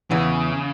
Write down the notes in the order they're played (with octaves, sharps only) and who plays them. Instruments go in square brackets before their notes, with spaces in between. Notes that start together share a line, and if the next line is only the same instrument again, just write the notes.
[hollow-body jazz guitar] E2 E3 [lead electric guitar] C#3